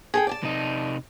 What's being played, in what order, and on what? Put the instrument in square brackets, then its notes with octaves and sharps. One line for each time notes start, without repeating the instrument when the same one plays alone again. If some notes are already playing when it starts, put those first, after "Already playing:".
[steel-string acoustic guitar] G#4 A4 G5
D5 G#5 A5
[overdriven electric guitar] C3 D#4